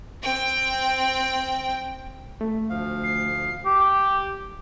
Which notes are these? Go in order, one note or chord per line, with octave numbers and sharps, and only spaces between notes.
C4 G5
A3
D2 F3 F5
C7
G4